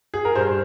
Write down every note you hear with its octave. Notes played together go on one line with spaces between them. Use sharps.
G#4
A#4
G2 C5